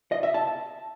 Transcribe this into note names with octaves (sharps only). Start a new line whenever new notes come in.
D#5
E5
A5